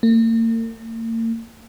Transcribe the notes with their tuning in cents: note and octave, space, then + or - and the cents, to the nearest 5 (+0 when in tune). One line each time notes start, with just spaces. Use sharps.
A#3 -45